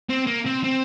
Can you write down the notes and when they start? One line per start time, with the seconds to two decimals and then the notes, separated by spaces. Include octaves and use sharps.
0.09 C4
0.26 A#3
0.45 C4
0.64 C4